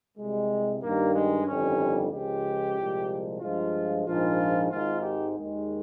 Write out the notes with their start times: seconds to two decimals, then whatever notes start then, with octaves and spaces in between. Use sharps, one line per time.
0.18 C2 C3 G3 G#3
0.83 G2 D#3 G3 A#3
1.15 G#3
1.47 G1 F2 D#3 G3 C#4
2.11 C#2 C#3 F3 G#3 G4
2.77 C2 A#2 F3 G#3
3.41 G2 F3 G#3 F4
4.06 A#1 G#2 F3 F4
4.71 G#1 G#2 D#3 F4
5.02 G4
5.35 D#2 D#3 G#3